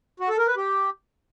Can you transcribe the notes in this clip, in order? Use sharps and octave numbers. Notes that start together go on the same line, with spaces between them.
F#4
A4
A#4
B4
G4